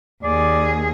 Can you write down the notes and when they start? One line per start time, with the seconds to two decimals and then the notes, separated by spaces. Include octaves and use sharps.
0.23 D#2 G#4 D5